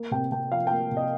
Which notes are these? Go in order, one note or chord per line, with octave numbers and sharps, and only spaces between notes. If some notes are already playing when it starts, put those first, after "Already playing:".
Already playing: A#3
C3 G5
C3 G5
F3 F5
G5
A#3
C3
D#5